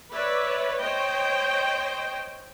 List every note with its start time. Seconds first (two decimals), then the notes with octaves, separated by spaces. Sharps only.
0.13 B4 C#5 D5 E5
0.80 C5 C#5 D#5 G5